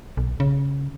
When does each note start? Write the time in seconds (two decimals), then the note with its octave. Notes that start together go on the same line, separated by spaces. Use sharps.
0.17 B1
0.40 C#3